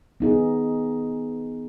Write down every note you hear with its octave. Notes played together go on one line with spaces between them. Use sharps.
B3 D#4 G#4